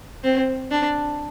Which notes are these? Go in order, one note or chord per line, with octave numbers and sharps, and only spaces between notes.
C4
D4